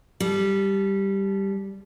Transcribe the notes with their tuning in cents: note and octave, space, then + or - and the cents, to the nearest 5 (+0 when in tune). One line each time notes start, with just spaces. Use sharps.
G3 +0 A4 -25